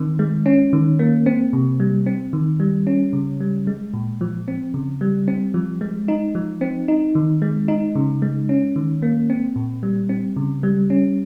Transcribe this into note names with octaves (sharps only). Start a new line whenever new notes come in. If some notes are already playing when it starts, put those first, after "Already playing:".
Already playing: D#3 C4
G#3
C#4
D#3
A#3
C4
C3
G3
C4
D#3
G3
C#4
C#3
G3
G#3
A#2
F3
C4
C#3
G3
C4
F3
G#3
D#4
F3
C4
D#4
D#3
G#3
D#4
C#3
G#3
C#4
D#3
A#3
C4
A#2
G3
C4
C#3
G3
C#4